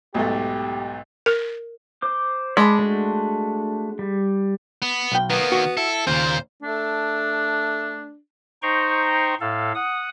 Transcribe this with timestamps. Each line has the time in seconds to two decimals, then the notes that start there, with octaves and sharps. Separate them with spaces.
0.14 B1 G#2 A3 G4
1.26 A#4
2.02 C5 D6
2.57 G#3 D5 A5 B5
2.79 A3 D4 F#4
3.99 G3
4.82 B3
5.12 B1 G5
5.30 D#3 A#3 B3
5.52 F#4
5.77 E4 A4
6.07 D#2 A#2 C#3 F4 C5
6.62 A3 D4
8.62 D#4 C5 G5 A#5 C6 C#6
9.41 A2 A4 F5
9.75 F#5 D#6